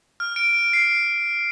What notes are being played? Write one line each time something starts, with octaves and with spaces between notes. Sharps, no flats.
F6
D7
C7